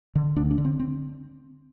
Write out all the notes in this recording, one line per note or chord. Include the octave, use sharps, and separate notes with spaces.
D3
D2 D4
D4
D3
C4
C4